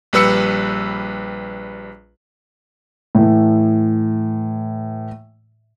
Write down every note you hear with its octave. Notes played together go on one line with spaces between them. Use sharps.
A#1 G3 B4 E6 C#7
A2 E3